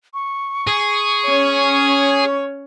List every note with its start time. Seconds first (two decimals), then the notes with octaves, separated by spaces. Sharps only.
0.14 C#6
0.67 G#4
1.26 C#4 C#5